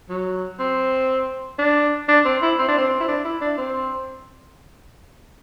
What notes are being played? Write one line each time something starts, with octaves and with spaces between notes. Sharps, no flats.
F#3
C4
D4
D4
C4
E4
C4
D4
C4
E4
D4
E4
D4
C4